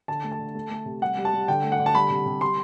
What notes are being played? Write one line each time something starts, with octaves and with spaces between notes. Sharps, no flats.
D3 A5
A3
A5
D3
A3
A3
C3
G3 F#5
G3
A5
G3
D3 G5
A3
F#5
D3
A5
G3 B5
C3
C3
G3 C6